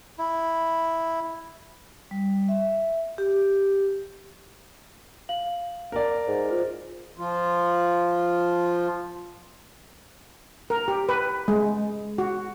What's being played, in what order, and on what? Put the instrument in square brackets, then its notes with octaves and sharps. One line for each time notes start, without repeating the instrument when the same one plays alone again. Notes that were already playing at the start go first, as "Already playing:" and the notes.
[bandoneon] E4
[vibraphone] G3
E5
G4
[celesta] F5 F#7
[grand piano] A#4 D5
[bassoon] G#2
[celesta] F4 C5
[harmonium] F3 F4
[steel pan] A#4
G4
B4
G#3
F#4